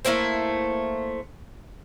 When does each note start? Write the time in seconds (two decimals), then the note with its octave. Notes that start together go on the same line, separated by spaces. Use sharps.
0.05 A3 A#3 E4 C5